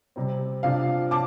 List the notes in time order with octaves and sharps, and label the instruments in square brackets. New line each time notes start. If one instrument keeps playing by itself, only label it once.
[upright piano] C3 G3 C4
C3 F3 D4 F4 F5
C3 A5 D6